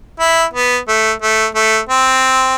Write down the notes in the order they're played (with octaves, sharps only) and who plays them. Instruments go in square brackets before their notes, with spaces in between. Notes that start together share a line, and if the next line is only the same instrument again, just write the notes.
[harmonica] E4
B3
A3
A3
A3
C4